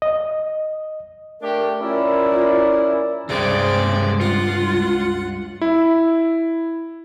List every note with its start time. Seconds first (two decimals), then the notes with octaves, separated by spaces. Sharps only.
0.02 D#5
1.41 A3 D4 G4 A#4
1.81 C#4 E4 F4 A#4 D5
3.29 C#2 G2 C3 C4 G#4 D5
4.21 F4 F#5
5.62 E4